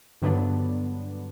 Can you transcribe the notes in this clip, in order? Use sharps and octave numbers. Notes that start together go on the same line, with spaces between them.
G2 D3 F#3 B3 D4